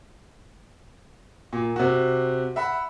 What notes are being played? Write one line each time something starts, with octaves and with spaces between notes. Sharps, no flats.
A#2
C3 F#4
E5 F#5 B5